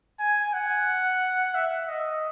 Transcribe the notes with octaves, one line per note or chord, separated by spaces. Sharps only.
G#5
F#5
E5
D#5